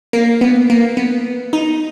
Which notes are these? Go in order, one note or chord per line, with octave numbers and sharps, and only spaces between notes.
A#3
B3
A#3
B3
D#4